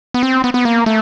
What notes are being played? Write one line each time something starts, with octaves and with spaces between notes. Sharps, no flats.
B3
C4
B3
B3
A#3
A3